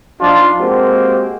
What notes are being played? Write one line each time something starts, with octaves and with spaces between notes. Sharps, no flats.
F3 D4 D#4 F4
G#3 A#3 C4 F#4 G4